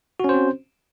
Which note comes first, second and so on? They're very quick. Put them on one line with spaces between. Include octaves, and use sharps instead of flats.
F#4 C#4 C5 C4